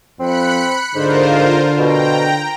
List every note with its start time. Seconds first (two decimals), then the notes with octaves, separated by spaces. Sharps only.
0.20 F2 C4 B5 F#6 C#7
0.95 G#2 D3 F4 A#4 C5
1.78 B2 G5 A#5